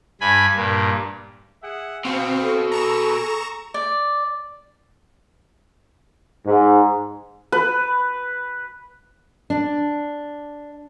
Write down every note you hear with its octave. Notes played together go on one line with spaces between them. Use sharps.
G2 G#5 B5
G2 A#2
G#4 E5 F#5
B2 C4 F5
A4
G#4 A#5 C#6 E7
D5
G#2
B4
D4